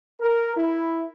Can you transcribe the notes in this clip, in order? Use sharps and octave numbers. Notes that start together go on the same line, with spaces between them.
A#4
E4